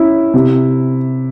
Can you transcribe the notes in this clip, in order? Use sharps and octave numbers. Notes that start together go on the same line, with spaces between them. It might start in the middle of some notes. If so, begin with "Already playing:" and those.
Already playing: C#4 E4
C3